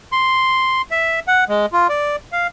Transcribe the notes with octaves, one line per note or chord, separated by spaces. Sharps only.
C6
E5
F#5
G#3
F4
D5
F5